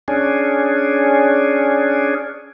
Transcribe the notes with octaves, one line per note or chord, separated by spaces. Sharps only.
C#4 D4 G#4